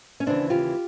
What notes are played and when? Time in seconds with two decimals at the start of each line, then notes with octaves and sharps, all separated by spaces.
0.20 C#4
0.26 D#2 C#3 E3 C4 D4
0.50 F4 G4